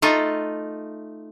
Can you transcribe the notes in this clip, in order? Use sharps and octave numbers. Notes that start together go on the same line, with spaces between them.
A3 D#4 F4